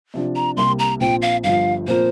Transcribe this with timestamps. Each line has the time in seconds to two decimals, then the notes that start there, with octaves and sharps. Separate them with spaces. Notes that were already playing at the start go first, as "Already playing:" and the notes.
0.14 C3 F3 D4
0.36 A#5
0.56 C2 C3 G3 A#3 G4 C6
0.79 A#5
1.00 A#1 A#2 F3 C4 G5
1.22 F5
1.44 G1 G2 F3 F5
1.87 A#2 F3 C4 A#4 C5